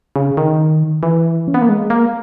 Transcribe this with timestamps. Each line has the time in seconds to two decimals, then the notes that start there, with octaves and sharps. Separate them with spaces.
0.16 C#3
0.37 D#3
1.03 E3
1.48 C#4
1.54 B3
1.62 A#3
1.69 G#3
1.90 A#3